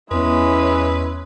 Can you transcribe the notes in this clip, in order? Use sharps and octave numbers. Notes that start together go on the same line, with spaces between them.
E2 G#3 C#4 E4 B4